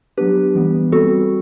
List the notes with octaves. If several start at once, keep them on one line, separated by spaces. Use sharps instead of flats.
F#3 B3 D4 G4 B4
E3 G3 B3
G3 C4 F#4 A4